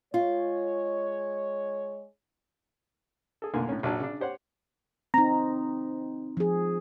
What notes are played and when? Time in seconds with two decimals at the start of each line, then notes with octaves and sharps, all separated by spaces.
0.14 G#3 F4 C#5
3.42 G#4 A4
3.54 B1 D3 A3 A#3 F4 G#5
3.69 A2 C#4
3.83 A#1 F#3 D4 C#5 A5
4.00 C#3 D4
4.21 G4 C5 C#5 F#5
5.14 C4 D#4 A#5
6.37 F3 G#4